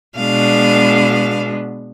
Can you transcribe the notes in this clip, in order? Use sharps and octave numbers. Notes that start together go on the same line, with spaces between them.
B2 G#3 B3 D4 F5